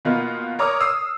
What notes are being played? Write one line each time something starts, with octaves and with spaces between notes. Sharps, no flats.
B2 D#3 A#3 B3 D#4 F4
A#4 C#5 A#5 D6 D#6 F6
D#6 E6 C7